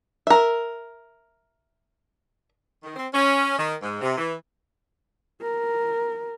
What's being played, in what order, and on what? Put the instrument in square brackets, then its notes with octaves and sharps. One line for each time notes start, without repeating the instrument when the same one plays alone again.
[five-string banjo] A#4 E5
[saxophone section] D#3
C4
C#4
D#3
G#2
C3
E3
[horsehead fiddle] A#4